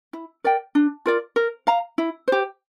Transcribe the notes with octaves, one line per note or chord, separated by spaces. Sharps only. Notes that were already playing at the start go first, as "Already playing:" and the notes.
E4
A#4 D5 G5
D4
F4 A#4 D5
A#4
F5 A#5
E4
G4 C5